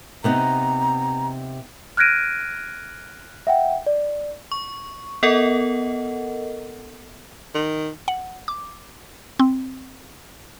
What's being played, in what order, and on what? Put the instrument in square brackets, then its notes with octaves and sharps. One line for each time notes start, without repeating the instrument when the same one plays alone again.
[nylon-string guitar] C3 B3 D#4 [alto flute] A#5
[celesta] F6 F#6 G#6 A#6 D7 D#7
E5 F#5 G5
D5
[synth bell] C#6
B3 A4 A#4 D#5 F#5
[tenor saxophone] D#3
[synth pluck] F#5
D6
C4